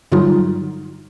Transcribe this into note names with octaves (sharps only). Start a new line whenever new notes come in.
G2 D3 F#3 G3 D#4 F4